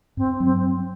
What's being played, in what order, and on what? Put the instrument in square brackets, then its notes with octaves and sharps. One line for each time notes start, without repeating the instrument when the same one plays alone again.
[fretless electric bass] G2 [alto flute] C4
[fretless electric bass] F#3 [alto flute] C4